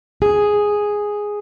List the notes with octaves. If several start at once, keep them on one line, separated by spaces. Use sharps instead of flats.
G#4